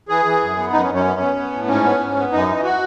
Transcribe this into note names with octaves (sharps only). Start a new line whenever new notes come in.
E3 G#4
E3
F#2
B3
F#2 D#4
C#4
F#2
C#4
B3
B3
B3
A2
G#2 C#4
B3
G#2
B3
F#2 D#4
E3
F#4